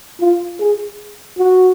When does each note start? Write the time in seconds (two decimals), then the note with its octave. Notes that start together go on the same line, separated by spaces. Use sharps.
0.20 F4
0.60 G#4
1.38 F#4